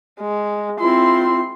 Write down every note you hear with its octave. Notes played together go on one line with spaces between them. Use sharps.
G#3
C4 E4 F4 C6